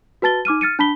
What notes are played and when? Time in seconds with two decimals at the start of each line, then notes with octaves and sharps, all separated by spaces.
0.22 F#4 B4 A5 A6 G7
0.45 D#4 D6 F6 D#7
0.61 F6 A6 C#7 D#7
0.79 D4 A5 B5 B6 G7